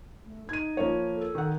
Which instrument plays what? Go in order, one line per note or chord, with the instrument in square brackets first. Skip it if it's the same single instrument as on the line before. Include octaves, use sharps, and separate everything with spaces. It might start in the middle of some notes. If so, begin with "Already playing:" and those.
[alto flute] A3
[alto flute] D#4 [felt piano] G#6 D#7
[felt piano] F3 A#3 C#5
[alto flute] A4
[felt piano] D#3 F#5